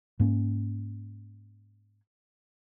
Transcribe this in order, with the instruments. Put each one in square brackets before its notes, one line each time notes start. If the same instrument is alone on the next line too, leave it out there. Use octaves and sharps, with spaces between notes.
[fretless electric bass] G#2 A#3 C#4